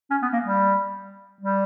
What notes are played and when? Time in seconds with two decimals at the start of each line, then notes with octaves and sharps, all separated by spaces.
0.10 C#4
0.22 B3
0.33 A#3
0.44 G3
1.41 G3